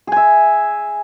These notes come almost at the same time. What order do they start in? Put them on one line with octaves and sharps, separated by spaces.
G#4 G#5 E5